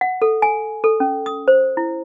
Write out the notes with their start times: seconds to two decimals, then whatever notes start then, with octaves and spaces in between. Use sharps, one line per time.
0.01 F#5
0.22 A4
0.42 G#5
0.84 A4
1.00 C#4
1.26 D#6
1.48 C5
1.77 E4